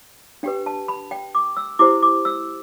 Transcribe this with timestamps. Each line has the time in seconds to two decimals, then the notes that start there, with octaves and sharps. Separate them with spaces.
0.43 D4 G4 B4 G5
0.66 A5
0.88 B5
1.11 G5
1.35 D6
1.57 E6
1.79 E4 G4 C5 D6
2.03 D6
2.25 E6